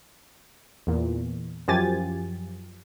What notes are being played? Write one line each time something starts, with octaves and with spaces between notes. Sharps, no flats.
E2 A#2
F#2 F3 G4 G#5 A6